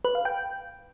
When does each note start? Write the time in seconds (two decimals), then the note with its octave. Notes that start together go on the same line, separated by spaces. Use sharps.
0.05 B4
0.15 F5
0.25 G5